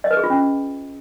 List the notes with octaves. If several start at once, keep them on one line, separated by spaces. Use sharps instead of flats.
D#5
B4
G#4
F4
C#4